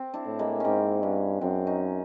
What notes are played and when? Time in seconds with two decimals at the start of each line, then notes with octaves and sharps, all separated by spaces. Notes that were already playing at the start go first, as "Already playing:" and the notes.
Already playing: C4
0.14 D4 E4
0.26 A2
0.39 G#3 A#3
0.60 G#2 A#3 C4 C#4
1.02 G2 B3 C#4
1.41 F#2 C4 D4
1.67 C#4 D#4